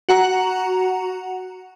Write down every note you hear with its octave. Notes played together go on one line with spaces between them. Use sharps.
F#4 F#5 A#5